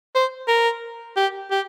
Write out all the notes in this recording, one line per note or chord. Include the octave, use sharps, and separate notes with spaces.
C5
A#4
G4
G4